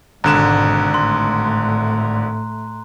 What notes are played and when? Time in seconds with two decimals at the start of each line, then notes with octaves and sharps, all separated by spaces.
0.24 G#1 G#2 B2 D3 A#5 F#6 E7
0.94 A2 A3 C6